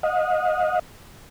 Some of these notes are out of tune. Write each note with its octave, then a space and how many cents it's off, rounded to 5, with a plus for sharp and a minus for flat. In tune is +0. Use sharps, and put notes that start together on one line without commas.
D#5 +0 F#5 -45